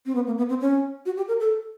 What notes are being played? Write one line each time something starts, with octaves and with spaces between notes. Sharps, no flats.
C4
B3
A#3
B3
C4
C#4
F#4
G4
A#4
A4